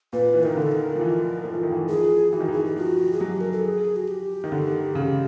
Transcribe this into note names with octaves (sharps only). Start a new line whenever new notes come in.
A#2 B4
E3
D#3 A#4
D3
A4
A#4
F3
E3
F3
E3
D#3
E3
F3 G#4
E3 F#4
D#3
E3
G#4
G4
F3 F#4
G#4
F#3 G4
A#4
A4
G#4
F#4
G4
D#3
D3
C#3